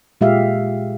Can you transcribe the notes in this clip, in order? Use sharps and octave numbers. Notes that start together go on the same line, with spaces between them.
A#2 G#3 F4 G4 E5 F5